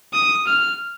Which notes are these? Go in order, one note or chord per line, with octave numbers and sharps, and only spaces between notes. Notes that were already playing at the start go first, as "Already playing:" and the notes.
D#6
F6